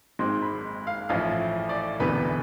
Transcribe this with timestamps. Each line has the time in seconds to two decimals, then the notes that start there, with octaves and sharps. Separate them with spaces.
0.19 G#1 G#2 G#3 C4 C6
0.42 B5
0.87 F5
1.09 A1 A2 F3 F5
1.69 D5
2.00 E1 D2 C3 E3 B3 B4